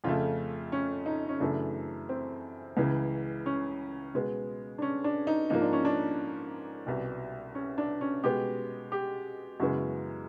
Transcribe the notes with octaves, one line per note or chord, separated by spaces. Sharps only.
F2 C#3 F3 A3 F4
C#4
D#4
C#4
F#2 C#3 E3 A3 D4
C4
C#2 C#3 E3
C#4
B2 G#3 B3
D4
C#4
D4
D#4
G#2 F3 A#3 D#4
D4
C#4
D4
C2 B2 G3
C#4
D4
C#4
B2 G#3 B3 G4
G4
F#2 C#3 E3 G#3 B3 F#4